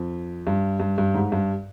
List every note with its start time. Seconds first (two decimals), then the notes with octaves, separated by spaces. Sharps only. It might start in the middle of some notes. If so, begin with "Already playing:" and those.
Already playing: F2
0.47 G2
0.80 G2
0.98 G2
1.14 G#2
1.32 G2